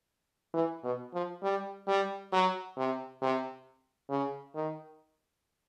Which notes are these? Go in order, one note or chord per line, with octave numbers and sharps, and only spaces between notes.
E3
B2
F3
G3
G3
F#3
C3
C3
C#3
D#3